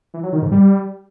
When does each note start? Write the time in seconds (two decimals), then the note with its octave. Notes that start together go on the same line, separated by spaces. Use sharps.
0.14 E3
0.23 F#3
0.33 D#3
0.42 G#2
0.52 G3